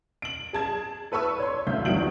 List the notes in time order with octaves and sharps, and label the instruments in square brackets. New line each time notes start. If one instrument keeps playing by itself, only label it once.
[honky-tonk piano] D7 F#7
G#4 A5 G#6
A4 B4 B5 C#6 E6
C#5 C6
D2 E5 F5 G6
G1 E2 D#3 F#4 D7 F#7